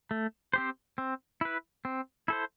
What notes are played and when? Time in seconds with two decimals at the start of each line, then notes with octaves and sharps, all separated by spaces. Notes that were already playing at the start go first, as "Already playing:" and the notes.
0.11 A3
0.54 C4 G4 C5
0.98 C4
1.41 E4 B4
1.85 C4
2.28 E4 A4 C5